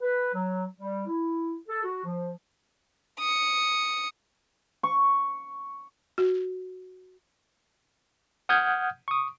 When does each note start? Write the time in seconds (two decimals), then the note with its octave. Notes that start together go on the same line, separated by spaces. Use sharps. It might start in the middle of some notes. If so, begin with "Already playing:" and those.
0.01 B4
0.33 F#3
0.77 G3
1.07 E4
1.68 A4
1.83 F#4
2.05 F3
3.20 D#6 C#7
4.83 C#6
6.18 F#4
8.49 F#5 D#6 F6 G6 G#6
9.08 C#6 D#6